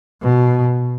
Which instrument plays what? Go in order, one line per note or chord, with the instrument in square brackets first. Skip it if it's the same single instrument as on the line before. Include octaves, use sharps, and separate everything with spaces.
[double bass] B2